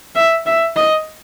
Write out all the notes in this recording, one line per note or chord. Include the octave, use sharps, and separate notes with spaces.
E5
E5
D#5